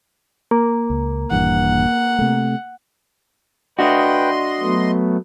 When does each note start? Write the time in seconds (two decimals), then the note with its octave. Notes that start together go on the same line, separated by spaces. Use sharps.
0.51 A#3
0.90 C#2
1.31 D#1 G2 E3 F#5
2.19 C3 A3
3.79 D4 F#4 B4 D#5 G5 C6
4.60 F#3 A3 B3